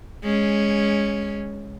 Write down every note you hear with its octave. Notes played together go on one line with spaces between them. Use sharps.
G#3 C#4